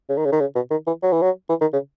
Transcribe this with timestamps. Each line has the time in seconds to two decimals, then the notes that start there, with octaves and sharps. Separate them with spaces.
0.09 C#3
0.17 D#3
0.25 C#3
0.32 D#3
0.40 C#3
0.55 B2
0.71 D#3
0.87 E3
1.02 F#3
1.12 E3
1.22 F#3
1.49 E3
1.61 D#3
1.73 C#3